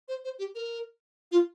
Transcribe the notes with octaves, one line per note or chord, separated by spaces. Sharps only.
C5
C5
G4
A#4
F4